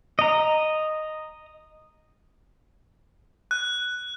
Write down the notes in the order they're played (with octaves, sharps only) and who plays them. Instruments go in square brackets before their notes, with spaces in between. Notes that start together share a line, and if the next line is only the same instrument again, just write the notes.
[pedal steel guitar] D#5 A#5
[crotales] F#6